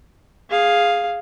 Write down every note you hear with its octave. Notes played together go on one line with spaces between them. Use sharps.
G#4 F5